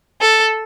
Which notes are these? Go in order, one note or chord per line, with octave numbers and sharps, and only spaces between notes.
A4